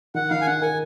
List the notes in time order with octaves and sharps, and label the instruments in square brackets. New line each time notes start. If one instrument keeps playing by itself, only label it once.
[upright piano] D#3 [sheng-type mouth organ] F#5
[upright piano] D#3 [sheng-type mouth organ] F5
[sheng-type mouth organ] G#5
[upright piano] D#4 [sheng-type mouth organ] F#5
[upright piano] A#4 [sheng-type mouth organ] G#5